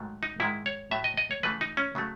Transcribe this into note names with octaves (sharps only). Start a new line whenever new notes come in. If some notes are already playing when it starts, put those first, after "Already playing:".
Already playing: G#2 D#3 F#3 A3
D#4
G#2 D#3 G#3 E4
C#5
A2 F#3 A3 E5
D#5
D#5
C#5
C#3 E3 A3 B4
D#4
C#4
C#3 F#3 A3